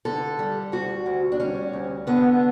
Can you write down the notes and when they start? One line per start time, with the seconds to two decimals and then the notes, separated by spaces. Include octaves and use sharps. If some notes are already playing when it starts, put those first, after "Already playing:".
0.05 D3 A4
0.39 G3
0.72 D2 F#4
1.06 D2
1.32 D4
1.40 G3 C#4
1.73 D2
2.07 D3 B3